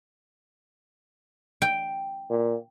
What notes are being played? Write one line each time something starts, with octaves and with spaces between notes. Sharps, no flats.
G5
A#2